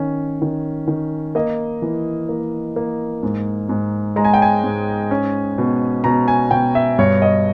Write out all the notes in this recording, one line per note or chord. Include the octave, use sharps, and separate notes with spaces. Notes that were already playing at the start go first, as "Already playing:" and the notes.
Already playing: D#3 C#4
D#3
D#3
A#3 D#5
E3
A#3
A#3
G#2
G#2
G#3 A#5
G#5
G5
G#5
G#2
C#4
B2
B2 A#5
G#5
B2 G5
E5
G2 C#5
D#5